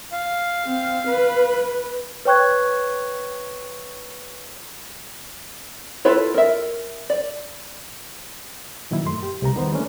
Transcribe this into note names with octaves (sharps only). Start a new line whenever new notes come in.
F5
C4
B4
B4 C#5 G5 C#6 F#6 G#6
E4 F4 A4 B4 C#5
A#4 E5
D5
A#2 D#3 F#3 A#3 E4
F#2 A3 C6
G4
C2 C3 G4 A#5
E2 D#3 G3 B3 C5 A#5
E3 A3 A#3 C#4 D4